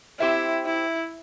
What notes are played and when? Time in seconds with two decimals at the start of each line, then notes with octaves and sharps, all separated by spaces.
0.19 C4 E4 G4 C5 E5
0.66 E4